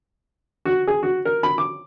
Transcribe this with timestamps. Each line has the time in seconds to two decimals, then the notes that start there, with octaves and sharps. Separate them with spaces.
0.65 F#4
0.87 G#4
1.03 F#4
1.25 A#4
1.43 B5
1.58 D6